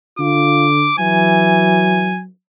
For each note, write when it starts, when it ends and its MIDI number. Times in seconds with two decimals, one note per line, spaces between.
0.19 0.90 50
0.19 0.68 65
0.19 0.95 86
0.99 2.15 52
0.99 2.27 54
0.99 2.21 80